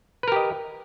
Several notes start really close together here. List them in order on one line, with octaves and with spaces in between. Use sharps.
B4 A#4 G4 D#5